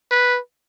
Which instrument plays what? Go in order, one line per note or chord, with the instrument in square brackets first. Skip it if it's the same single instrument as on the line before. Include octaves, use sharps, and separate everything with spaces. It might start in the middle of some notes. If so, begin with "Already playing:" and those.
[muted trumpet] B4